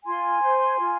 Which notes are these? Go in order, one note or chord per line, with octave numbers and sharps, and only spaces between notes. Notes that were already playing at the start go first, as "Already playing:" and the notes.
F4 G#5 C6
C5
F4